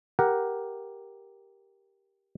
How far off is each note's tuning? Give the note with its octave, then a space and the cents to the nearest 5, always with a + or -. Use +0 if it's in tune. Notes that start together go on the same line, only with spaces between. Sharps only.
G4 +0 A#4 +5 F#5 +5